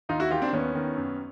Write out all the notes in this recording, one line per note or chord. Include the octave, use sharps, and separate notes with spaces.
D#2 D#4 F4
E4 F#4
D#3 F4 G4
C4 D4
D#2 B3 C#4
D#3
F#2